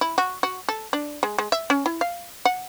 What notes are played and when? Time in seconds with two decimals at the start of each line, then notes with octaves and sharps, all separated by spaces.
0.01 E4
0.18 F#4
0.43 F#4
0.69 A4
0.93 D4
1.23 G#3
1.38 G#3
1.52 E5
1.70 C#4
1.86 E4
2.01 F5
2.45 F#5